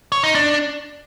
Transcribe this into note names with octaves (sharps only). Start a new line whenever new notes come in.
C#5
D#4
D4